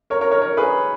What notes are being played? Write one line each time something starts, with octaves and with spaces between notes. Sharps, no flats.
A#4 C#5
A#4 C#5
A#4 C#5
A#4 C#5
G#4 B4